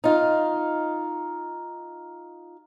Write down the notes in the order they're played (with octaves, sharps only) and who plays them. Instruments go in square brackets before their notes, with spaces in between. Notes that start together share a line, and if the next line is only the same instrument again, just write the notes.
[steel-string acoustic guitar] D#4 F4